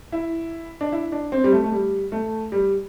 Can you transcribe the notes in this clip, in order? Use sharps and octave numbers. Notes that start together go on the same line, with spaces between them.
E4
D4
E4
D4
C4
G3
A3
A3
G3
A3
G3